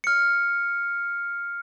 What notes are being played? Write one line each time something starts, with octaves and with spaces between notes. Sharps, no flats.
F6 C#7